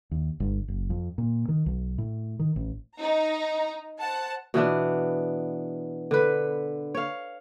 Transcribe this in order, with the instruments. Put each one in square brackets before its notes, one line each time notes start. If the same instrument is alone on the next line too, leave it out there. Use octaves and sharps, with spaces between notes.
[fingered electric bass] D#2
G1
F#1
F2
A#2
D#3
B1
A2
D#3
A1
[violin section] D#4 A#5
C5 F#5 A5
[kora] B2 E3 B3 D4
D3 B4
C#5 F5